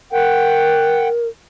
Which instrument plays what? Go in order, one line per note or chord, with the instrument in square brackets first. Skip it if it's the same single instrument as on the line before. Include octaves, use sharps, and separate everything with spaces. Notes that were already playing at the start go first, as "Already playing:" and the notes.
[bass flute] A#4 [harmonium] F#5 G5